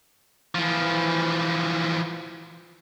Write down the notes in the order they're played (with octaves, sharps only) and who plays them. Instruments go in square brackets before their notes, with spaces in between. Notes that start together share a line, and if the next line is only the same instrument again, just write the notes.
[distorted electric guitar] E3 F3